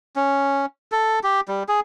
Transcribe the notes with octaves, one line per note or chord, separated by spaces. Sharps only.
C#4
A4
G4
G3
G#4